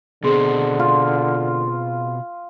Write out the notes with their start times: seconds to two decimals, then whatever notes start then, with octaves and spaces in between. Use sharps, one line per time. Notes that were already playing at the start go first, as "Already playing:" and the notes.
0.24 B2 D3 C4 G#4 C6
0.79 F4